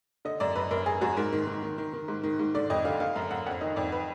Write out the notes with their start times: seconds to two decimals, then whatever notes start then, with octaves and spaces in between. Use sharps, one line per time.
0.25 D3 D#5
0.40 F#2 D5
0.56 F#2 B4
0.71 F#2 A#4
0.86 F#2 G#4
1.01 F#2 F#4
1.17 G#2 A#4
1.32 D#3
1.47 D#3
1.63 D#3
1.78 D#3
1.93 D#3
2.08 G#2
2.23 D#3
2.39 G#2
2.55 D3 D5
2.70 F2 D#5
2.85 D3 F5
3.00 D3 F5
3.15 F#2 F5
3.31 F#2 F#5
3.46 F2 F#5
3.61 D#3 D#5
3.76 F2 D5
3.92 B4